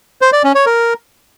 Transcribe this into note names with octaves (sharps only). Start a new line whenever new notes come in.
C5
D5
C#4
C#5
A#4